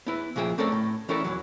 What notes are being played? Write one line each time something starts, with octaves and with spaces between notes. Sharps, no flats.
B3 E4 B4
C#2 A#2 F3 G#4 E5 G5
A3 C4 C#4 A4 A#4 D5
A2
E3 C#4 E4 A4 A#4 D5
E2 A2 E3 F#3